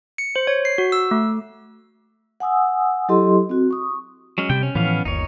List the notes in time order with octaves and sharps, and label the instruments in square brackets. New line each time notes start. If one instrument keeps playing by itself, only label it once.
[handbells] C#7
C5
C#5
C7
F#4
E6
A3
[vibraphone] F#5 G#5 D#6 E6
F#3 E4 G4 A4 D#5 C6
C4 F#4
C#6 D#6
[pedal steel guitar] F#3 G#3 C#4
[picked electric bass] C3 [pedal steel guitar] G3 G5
[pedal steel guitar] C#4
[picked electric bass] A2 E3 F3 [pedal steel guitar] B3 C#4 F5
[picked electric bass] G1 D#2 [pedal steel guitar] D#4 C#5